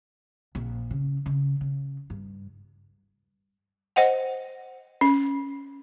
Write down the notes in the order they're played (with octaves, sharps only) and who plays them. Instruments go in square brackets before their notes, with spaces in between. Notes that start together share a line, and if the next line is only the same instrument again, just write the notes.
[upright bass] A#1
C#3
C#3
C#3
G2
[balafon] C5 D#5 F#5 G5
C#4